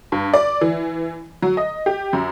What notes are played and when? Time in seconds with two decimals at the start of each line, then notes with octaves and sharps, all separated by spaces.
0.12 G2
0.33 D5
0.61 E3
1.42 F#3
1.57 D#5
1.86 G4
2.13 F#2